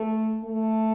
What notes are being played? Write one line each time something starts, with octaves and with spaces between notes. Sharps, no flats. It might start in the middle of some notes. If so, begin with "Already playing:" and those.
Already playing: A3
A3